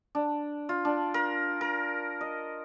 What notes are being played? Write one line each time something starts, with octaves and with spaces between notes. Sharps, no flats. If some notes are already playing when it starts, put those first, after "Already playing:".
D4
F4
D4
A#4
A#4
D#5